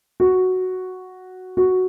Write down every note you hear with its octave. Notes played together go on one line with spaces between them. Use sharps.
F#4
F#4